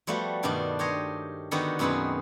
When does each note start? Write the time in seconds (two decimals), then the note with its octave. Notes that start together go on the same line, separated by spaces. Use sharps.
0.07 F3 G3 A3 B3 F#4
0.43 G2 B2 D#3 A3 D4
0.79 G4 C5 C#5 D#5
1.51 D3 D#3 B3 F#4 G4
1.79 F#2 B2 B3 C4 G#4 B4